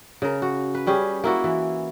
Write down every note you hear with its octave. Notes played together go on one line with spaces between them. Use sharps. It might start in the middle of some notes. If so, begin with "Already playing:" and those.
C#3 A#4
F#4
B4
G3 C#4 G4 G#4
A#3 E4 F#4
E3